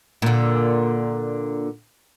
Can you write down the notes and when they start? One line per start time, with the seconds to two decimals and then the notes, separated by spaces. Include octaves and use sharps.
0.22 A#2 D3